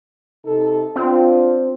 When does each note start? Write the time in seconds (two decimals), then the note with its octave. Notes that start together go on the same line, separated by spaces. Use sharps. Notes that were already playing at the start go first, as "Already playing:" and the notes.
0.45 C3 D#4 A4
0.96 C4 D4 F4